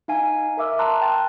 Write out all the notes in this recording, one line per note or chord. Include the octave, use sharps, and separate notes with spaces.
D#4 F5 G#5
A#4 E5 D6 E6 F6
A5 A#5 C6 F#6
G5 F#6 A6